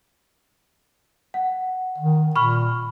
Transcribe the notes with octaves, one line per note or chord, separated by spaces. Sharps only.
F#5
D#3
A#2 B5 C#6 F6